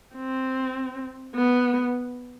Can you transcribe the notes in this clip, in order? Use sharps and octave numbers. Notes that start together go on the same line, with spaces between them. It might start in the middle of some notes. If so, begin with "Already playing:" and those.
C4
B3